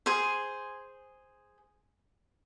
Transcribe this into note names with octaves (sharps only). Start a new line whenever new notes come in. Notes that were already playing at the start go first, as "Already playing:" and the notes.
G#4 C5